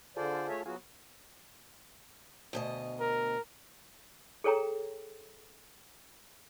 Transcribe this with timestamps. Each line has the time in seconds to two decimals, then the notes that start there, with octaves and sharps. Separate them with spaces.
0.17 D3 F4 G#4 A4 C5 D5
0.49 A3 C#5 E5
0.66 F#3 B3 F4 F#4 G#4
2.53 D2 B2 D#5
3.00 A#4
4.44 G#4 A4 C#5 G5 A#5